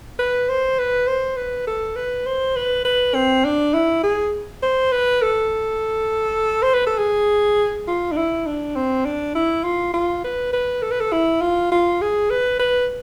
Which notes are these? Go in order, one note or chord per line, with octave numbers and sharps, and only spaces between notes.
B4
C5
B4
C5
B4
A4
B4
C5
B4
B4
C4
D4
E4
G#4
C5
B4
A4
C5
B4
A4
G#4
F4
D4
E4
D4
C4
D4
E4
F4
F4
B4
B4
A4
B4
A4
E4
F4
F4
G#4
B4
B4